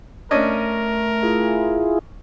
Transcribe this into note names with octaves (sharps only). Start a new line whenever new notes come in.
A3 C#4 D4 A#4 D#5
E4 F4 G#4